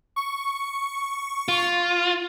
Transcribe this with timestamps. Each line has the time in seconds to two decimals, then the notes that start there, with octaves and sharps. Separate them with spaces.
0.16 C#6
1.48 F4